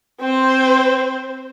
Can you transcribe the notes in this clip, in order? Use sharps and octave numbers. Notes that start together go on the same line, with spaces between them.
C4 C5